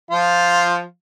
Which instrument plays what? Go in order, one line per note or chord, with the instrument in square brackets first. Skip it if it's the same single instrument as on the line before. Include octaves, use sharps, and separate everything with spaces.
[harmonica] F3 F4